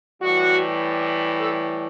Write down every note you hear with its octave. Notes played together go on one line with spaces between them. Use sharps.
A2 E3 G3 F#4
A4